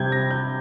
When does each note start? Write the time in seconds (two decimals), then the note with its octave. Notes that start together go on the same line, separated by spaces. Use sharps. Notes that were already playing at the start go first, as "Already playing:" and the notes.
Already playing: C3 G3 G6 G#6
0.12 A#6
0.31 G6